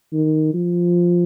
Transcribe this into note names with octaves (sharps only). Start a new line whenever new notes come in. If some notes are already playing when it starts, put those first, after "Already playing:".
D#3
F3